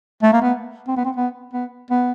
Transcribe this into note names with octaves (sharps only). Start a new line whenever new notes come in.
A3
A#3
B3
C4
B3
C4
B3
B3
B3